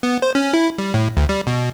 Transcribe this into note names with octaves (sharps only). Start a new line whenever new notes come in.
B3
C5
C#4
E4
G3
A2
D2
G3
B2